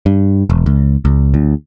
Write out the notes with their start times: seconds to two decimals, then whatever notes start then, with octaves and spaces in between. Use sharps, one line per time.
0.06 G2
0.50 E1
0.66 C#2
1.05 C#2
1.34 D2